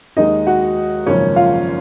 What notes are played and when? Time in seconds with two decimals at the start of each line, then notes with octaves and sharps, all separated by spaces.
0.17 D#2 D#3 G#3 D#4 D#5
0.47 F#4 F#5
1.06 G#1 F#2 C#3 F3 A#3 C#4 C#5
1.36 F4 F5